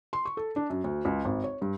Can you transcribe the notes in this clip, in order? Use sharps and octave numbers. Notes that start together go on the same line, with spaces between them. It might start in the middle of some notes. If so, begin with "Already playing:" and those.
C6
C#6
A4
D4
F#2
D2
C#2
G#1
C#5
G2